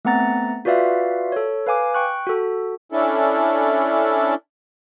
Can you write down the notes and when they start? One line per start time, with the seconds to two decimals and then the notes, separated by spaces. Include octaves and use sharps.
0.05 A3 B3 C4 F#5 A#5 A6
0.65 F4 F#4 B4 D5 E5 F5
1.32 A4 C#5
1.67 B4 F5 G#5 D6
1.94 G5 C#6 F#6
2.27 F#4 A4
2.92 C#4 D4 E4 A4